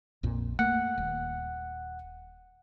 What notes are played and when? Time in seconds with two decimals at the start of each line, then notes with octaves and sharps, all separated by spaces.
0.23 A#1 F2 A#2
0.59 A3 A#3 F#5
0.98 D#1